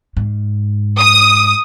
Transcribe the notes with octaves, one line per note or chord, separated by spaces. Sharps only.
G#2
D#6